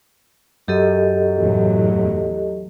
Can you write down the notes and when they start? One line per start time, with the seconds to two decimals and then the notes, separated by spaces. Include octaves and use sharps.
0.68 F#2 G4 A4 D#5
1.37 E2 A2 F#3